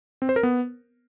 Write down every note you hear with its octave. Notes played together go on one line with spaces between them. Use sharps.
C4
C5
A#4
B3